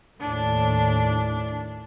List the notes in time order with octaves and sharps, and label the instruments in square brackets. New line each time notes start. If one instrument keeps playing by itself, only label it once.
[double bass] D#2 A2 [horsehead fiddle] D4